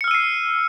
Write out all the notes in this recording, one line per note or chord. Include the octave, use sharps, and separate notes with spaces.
E6 F6 C7 C#7 D#7